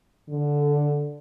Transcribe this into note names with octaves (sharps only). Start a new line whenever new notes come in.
D3